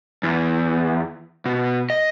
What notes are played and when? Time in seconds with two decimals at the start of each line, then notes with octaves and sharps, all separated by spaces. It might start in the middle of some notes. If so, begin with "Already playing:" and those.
0.23 E2
1.46 B2
1.90 D#5